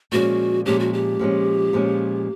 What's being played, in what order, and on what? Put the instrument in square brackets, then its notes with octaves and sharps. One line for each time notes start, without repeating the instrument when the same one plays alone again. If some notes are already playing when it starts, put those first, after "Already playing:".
[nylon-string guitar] A#2 F3 G#3 C#4 [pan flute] F#4
[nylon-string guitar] A#2 F3 G#3 C#4 [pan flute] G4
[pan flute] F#4
G4
[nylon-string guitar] A#2 F3 G#3 C#4
A#2 F3 G#3 C#4